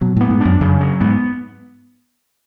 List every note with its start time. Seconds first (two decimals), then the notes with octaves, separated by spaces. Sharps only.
0.01 B2 F#3
0.17 A2 B3
0.31 G#2
0.41 F#2 D4
0.61 F#2 C#3
0.81 F#3
1.01 G#2 B3